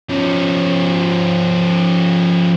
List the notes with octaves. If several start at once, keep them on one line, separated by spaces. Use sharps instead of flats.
F3 C#4